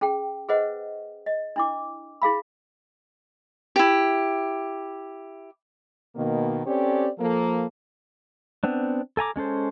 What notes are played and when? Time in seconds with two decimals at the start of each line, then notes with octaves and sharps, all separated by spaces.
0.01 C#4 G#4 G5
0.49 G#4 B4 C5 D#5 F#5
1.26 D#5
1.56 D4 E4 D6
2.22 E4 G#4 F5 B5
3.76 E4 G4
6.15 B2 D#3 A#3
6.66 C4 C#4 G4 A4 C#5 D5
7.19 F3 A#3 A4
8.64 B3 C4 D4
9.17 A4 G#5 A#5 D6
9.36 G#3 C#4 A4 C5